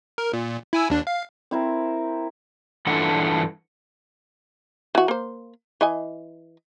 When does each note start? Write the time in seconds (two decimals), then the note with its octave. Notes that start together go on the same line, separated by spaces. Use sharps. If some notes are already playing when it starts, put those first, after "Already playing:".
0.18 A#4
0.33 A#2
0.73 E4 G#5 E6
0.90 D#2 D4
1.07 F5
1.51 C4 E4 A#4
2.87 G2 E3 D4 F4 A4 F#5
4.95 E3 F#4
5.08 A#3 C5
5.81 E3 D#5 G#5